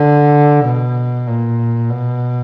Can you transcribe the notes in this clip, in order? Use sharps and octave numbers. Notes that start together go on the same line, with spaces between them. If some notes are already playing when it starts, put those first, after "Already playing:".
Already playing: D3
B2
A#2
B2